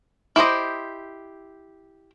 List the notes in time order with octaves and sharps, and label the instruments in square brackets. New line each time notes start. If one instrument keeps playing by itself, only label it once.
[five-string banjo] E4 G4 C5 D#5